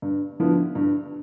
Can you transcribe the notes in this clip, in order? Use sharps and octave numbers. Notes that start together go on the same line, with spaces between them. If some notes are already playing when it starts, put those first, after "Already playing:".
G2
D3 F3 B3 E4
G2